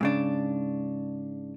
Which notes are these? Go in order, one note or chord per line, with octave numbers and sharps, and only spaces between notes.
G#2 C#3 D4